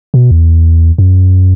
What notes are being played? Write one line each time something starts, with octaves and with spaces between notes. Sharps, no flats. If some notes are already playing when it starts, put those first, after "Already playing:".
B2
E2
F#2